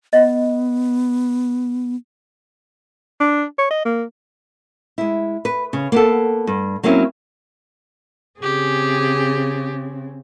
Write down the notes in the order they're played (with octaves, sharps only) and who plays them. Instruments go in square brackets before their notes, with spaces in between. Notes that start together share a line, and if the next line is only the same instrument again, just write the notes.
[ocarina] B3 [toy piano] D#5 F#5
[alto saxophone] D4
C#5
D#5
A#3
[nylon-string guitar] G#3 E4
B4
C#3
A#3 B3 A4
G2
F#3 A#3 C4 C#4 E4
[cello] C#3 C4 [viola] G4 G#4